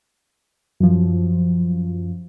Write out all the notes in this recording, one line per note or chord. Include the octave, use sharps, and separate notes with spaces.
F#2 F3